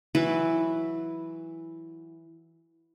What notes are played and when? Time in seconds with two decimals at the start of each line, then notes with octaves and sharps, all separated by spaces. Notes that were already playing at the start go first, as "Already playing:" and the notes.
0.15 E3 F#3 E4 B4